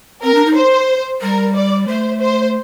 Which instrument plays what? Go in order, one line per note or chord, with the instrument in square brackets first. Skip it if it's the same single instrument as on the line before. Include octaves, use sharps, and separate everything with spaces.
[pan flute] C4 [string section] A#4
[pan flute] D4
D#4
[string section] C5
[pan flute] G3 [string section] A#4
[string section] D5
[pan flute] A3 [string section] C5
[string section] C5